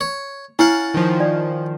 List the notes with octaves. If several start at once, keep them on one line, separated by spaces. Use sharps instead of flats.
C#5
C#4 E4 F5 F#5 A6
D#3 F3
D5